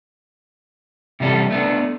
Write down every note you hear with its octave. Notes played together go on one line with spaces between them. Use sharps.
C3 E3 G3 D4 A4
A3 B3 D4